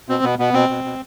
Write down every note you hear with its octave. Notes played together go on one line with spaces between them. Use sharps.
B2 C4
B2 B3
B2 B3
B2 C4
B2
B2